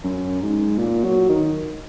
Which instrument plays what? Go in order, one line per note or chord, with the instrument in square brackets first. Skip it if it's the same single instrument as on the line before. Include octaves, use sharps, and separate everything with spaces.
[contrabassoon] F#2
G#2
A#2
F#3
D#3